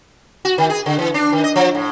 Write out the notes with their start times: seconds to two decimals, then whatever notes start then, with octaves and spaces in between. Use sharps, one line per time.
0.45 F#4
0.58 D#3
0.70 G#4
0.86 D3
0.99 E3
1.14 D4
1.32 D#3
1.44 D#5
1.56 F3
1.75 A2